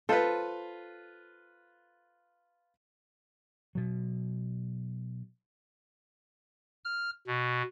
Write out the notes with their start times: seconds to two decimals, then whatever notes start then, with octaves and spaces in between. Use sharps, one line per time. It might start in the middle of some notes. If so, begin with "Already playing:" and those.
0.09 F4 A4 B4 C5
3.75 B2 F#3
6.84 F6
7.27 B2